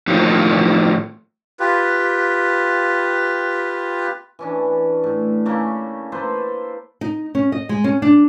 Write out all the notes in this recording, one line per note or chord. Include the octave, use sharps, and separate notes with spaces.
A2 D#3 F3 F#3 A#3
F4 G4 B4
E3 C#4 D4
A2
C#3 A3 A#3 C#4
A#3 A4 B4 C5
D#4
C#4
D#5
G#3
C#4
D4